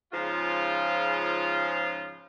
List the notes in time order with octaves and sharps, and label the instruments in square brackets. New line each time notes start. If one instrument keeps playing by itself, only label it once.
[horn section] G#2 C#3 F3 F4